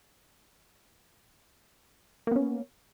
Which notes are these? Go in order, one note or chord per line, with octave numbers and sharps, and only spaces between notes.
A#3 B3 C#4